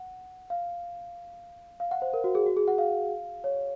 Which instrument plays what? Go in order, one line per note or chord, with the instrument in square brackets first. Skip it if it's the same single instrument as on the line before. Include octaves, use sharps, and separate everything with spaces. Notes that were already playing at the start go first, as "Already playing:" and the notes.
Already playing: [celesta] F#5
F5
F5
F#5
C5
A#4
F#4
G#4
F#4
G#4
F#5
F5
C#5